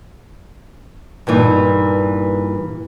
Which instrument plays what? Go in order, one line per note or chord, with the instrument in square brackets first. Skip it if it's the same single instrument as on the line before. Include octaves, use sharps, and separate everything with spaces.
[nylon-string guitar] G2 A#2 E3 D#4